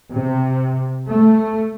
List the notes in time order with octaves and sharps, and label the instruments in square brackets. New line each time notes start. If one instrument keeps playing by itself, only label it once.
[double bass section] C3
A3